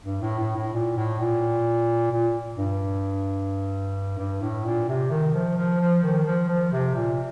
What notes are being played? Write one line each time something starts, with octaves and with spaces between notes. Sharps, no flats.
G2
A2
A2
A2
A#2
A2
A#2
A#2
G2
G2
A2
A#2
C3
D#3
F3
F3
F3
D#3
F3
F3
C3
A#2